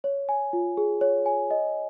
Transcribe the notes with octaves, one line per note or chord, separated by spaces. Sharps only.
C#5
G#5
F4
G#4
C#5
G#5
D#5